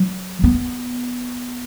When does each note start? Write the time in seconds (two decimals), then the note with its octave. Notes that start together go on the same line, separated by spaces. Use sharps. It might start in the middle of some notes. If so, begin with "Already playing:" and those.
Already playing: F#3
0.44 B3